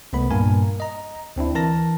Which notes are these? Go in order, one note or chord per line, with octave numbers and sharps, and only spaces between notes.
C2 A3 B3 B5
G2 A#2 A#3 A#4 G#5
D#5 A#5
D2 C4 D4 E4
E3 A#4 A5 A#5 A#6